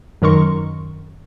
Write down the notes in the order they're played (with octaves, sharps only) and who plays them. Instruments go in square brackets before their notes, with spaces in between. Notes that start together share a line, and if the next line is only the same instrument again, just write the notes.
[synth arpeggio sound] F#2 D#3 A#4 C6 C#6